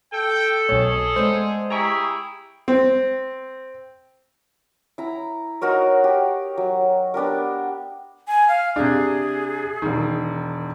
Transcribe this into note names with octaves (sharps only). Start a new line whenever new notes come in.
A4 G5
B1 B2 G#4 C#5
G#3 B3 C5 D5
E4 G4 G#4 A#5 C#6
C4
E4 A#5
D#4 F#4 A#4 C#5
G4
F#3
B3 D4 G4 A#4
G#5
F5
C3 D4 G#4
E1 D#3